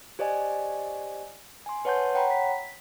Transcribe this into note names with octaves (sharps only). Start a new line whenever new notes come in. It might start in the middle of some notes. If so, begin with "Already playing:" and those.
G4 C5 D5 D#5 G#5
G#5 C6
B4 C#5 F#5 A5 C6 G6
C#5 F#5 G5 A#5 B5
B6